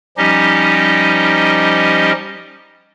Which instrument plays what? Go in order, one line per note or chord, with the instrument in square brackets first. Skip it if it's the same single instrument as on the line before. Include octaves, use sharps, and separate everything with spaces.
[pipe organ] F3 G3 C#4 D#4 G4 D#5